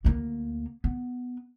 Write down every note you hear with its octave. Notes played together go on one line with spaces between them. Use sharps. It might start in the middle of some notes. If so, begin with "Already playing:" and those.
D2 A#3
B3